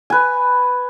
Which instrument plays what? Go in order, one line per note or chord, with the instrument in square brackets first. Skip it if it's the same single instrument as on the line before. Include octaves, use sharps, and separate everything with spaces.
[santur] B4 G#5